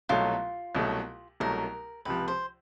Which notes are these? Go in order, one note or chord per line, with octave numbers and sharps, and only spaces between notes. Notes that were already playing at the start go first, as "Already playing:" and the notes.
C2 B2 F#3 A3 F4
C2 B2 F#3 A3
C2 B2 F#3 A3 A#4
C#2 C3 F3 B4
C5